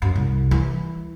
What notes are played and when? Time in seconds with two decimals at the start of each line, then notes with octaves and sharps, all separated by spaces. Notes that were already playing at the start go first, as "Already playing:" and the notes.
0.02 F#2
0.15 C2
0.51 E3